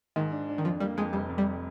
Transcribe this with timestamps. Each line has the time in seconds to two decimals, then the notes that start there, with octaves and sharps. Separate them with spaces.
0.16 G#2 D#3
0.32 D4
0.49 D4
0.58 D#3
0.64 F2 F3
0.80 G3 A#3
0.97 F2 G#3
1.13 F1 G3
1.30 F2
1.38 G3